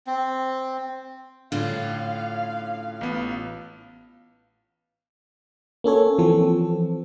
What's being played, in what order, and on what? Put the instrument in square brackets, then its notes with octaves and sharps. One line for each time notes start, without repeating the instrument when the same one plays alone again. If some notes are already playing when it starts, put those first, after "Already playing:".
[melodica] C4
[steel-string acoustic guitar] A2 C#4 F4 [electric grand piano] D3 [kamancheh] F5
[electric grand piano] A1 B3
[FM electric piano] A#3 C#4 A4 C#5
E3 F3 C4 A4